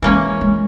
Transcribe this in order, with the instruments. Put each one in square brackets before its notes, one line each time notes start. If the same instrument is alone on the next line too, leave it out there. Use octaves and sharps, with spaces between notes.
[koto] E3 A#3 C#4 [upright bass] G#3
[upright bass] G#3